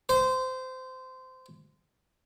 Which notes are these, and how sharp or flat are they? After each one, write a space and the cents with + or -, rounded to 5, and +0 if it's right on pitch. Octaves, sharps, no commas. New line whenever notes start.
C5 -20